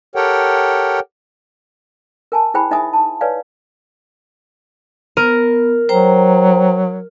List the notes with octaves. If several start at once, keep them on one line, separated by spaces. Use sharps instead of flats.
G4 A4 A#4 C#5 F#5 G5
A#4 G#5 A5
E4 G#4 C5 G5 G#5 B5
D#4 D#5 E5 G#5 D#6
A5
B4 C#5 D5 F5 G#5
B3 A#4
F#3 C5 G5 A#5